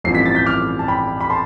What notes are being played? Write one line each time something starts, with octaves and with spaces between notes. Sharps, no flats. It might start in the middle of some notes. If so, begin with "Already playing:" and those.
A1 G2 F3 C4 C7
B6
A6
G6 B6
D6 F6
A5
G5 B5
B5
A5 C6